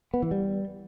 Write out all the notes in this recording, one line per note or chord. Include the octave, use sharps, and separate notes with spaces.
B3
E3
G3